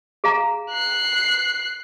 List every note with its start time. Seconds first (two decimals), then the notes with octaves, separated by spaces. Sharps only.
0.24 G#4 F5 A#5
0.71 F#6 C7